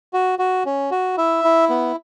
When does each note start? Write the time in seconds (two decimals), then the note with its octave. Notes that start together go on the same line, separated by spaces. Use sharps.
0.13 F#4
0.39 F#4
0.66 C#4
0.91 F#4
1.17 E4 E5
1.44 E4
1.70 B3